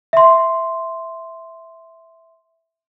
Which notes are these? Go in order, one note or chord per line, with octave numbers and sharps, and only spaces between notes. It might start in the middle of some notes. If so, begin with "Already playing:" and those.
E5 C6